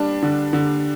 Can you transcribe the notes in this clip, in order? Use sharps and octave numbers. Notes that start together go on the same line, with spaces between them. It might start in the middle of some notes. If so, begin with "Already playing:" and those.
Already playing: G3 D4
D3
D3